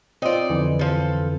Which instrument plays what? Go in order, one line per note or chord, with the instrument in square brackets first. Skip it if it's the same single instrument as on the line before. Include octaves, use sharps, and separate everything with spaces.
[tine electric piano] C4 F4 [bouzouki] D#4 D5
[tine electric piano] F2 D3 E3
[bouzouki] F3 A4